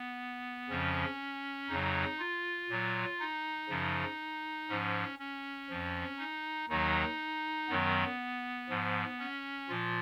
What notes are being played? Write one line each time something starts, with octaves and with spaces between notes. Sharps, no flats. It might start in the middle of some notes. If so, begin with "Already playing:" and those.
Already playing: B3
F2 C#3 F3 C#4
F2 C#3 F#3 D#4
F4
A#2 F#3
D#4
F#2 C#3 F3
G#2 F3 C#4
C#4
F2 F3
D#4
D#2 D#3 F#3 D#4
F#2 D#3 F#3 B3
G#2 F3
C#4
A#2 F3 F4